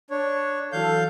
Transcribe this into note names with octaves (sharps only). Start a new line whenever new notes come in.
D4 C#5
E3 F#3 A4 F5 G6